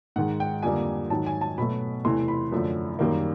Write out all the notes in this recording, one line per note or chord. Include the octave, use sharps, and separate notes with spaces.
G#2 D#3 G#3 F#5
G5
F2 D3 G3 A#3 G#5
G#2 D#3 F#3 A5
G#5
A5
B2 F#3 A3 B5
E2 C3 E3 A3 C6
B5
F#2 D3 F3 A3
F#2 D#3 G3 A#3